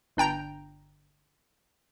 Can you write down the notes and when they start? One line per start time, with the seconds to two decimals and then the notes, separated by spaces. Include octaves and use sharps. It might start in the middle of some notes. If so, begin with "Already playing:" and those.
0.17 G1 D4 G5 A#5 G6